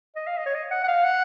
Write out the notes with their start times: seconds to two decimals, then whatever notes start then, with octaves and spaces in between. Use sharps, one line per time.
0.16 D#5
0.27 F5
0.38 D#5
0.46 C#5
0.55 D#5
0.71 F#5
0.84 F#5
0.88 F5
1.04 F#5